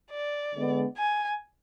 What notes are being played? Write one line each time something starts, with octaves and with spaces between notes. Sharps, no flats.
D5
D3 G#3 B3
G#5